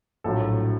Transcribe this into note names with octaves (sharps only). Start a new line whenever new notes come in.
A#1 A2 F#3 A4